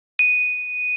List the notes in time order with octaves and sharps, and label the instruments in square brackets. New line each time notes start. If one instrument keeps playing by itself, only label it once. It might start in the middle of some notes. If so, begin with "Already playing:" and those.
[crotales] D#7